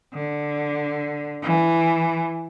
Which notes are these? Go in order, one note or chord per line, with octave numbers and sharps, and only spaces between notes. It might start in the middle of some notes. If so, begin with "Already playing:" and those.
D3
E3